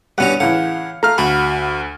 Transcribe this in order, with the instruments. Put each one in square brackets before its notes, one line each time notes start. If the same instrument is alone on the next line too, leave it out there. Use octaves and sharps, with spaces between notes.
[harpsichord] G2 C#4 A#5 [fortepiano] B2 F#5
[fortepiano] A2 C#3 E3 [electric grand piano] F5 [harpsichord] F#5
[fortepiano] A3 F5 [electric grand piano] A#5 F6
[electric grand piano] D2 B5 [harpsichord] F#4